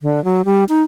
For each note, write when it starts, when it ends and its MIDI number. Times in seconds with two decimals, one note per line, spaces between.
0.01 0.23 50
0.25 0.42 54
0.45 0.64 55
0.69 0.82 63